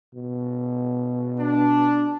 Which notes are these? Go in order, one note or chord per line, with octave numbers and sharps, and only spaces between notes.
B2
D4